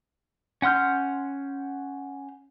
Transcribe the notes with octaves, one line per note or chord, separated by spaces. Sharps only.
C#4 F#5 C6 F6 G6